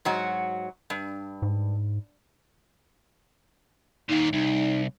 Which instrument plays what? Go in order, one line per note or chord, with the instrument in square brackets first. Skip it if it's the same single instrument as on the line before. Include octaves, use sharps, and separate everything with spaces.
[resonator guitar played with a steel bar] G#2 F#3 F#4
G2
[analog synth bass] G#2
[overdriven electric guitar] D#2 A#2 [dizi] D#4
[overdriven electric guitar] C2 [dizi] D#4